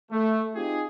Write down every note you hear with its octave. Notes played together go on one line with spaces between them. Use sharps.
A3
C4 D#4 F4 G4 G#4